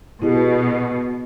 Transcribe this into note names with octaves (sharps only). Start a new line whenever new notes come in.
B2 E4 G4 G#4